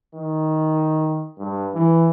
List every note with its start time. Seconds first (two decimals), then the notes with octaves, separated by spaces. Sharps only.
0.15 D#3
1.39 G2
1.75 E3